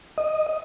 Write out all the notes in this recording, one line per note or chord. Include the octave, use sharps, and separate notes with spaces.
D#5